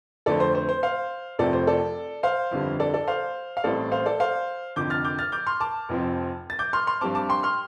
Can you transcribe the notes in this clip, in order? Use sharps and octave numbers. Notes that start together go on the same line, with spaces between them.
F2 D3 A3 C4 A4 D5
C5
C5
C5
C5 F5
F1 F2 C3 F3 A3 A4 D5
C5
A4 D5
C5 F5
G1 F2 D3 G3
A4 D5
A4 D5
C5 F5
F5
A1 A2 G3 C4 A4 D5
C5 F5
A4 D5
C5 F5
F1 F2 D3 D6 G6
F6 A6
D6 G6
F6 A6
D6 G6
C6 F6
A5 D6
F1 F2 F3 C4
A6
D6 G6
C6 F6
C6 F6
G2 G3 C4 A5 D6
A5 D6
G5 C6
C6 F6